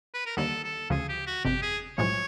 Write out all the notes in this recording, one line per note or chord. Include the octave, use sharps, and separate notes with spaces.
B4
A#4
D#2 D3 G3 A4
A4
D2 C#3 F3 G#4
G4
F#4
G1 F2 C3 G4
G#4
B1 A2 F3 G#3 C#5